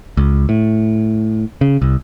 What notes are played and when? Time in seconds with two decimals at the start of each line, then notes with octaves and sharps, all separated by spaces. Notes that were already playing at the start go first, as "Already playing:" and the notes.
0.17 C#2
0.49 A2
1.61 C#3
1.82 C2